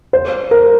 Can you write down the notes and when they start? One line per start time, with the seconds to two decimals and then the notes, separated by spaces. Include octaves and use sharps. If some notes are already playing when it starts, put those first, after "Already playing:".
0.13 C5
0.51 A#4